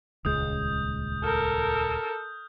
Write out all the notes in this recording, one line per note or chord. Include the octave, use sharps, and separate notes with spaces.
D#1 C#2 G#3 D#6 G6
A4 A#4 F6 G6